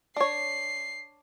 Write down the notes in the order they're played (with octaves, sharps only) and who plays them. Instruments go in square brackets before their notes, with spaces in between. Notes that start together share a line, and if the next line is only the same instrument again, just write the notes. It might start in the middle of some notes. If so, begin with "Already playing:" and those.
[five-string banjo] D4 C#5 [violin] C7